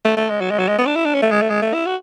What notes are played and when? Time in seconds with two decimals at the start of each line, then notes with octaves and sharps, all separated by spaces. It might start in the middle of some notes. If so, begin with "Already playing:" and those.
0.05 A3
0.17 A3
0.30 G#3
0.41 F#3
0.51 G#3
0.59 F#3
0.69 G#3
0.78 B3
0.86 D4
0.96 E4
1.05 D4
1.14 C#4
1.22 A3
1.31 G#3
1.41 A3
1.50 G#3
1.62 A3
1.74 E4
1.86 F#4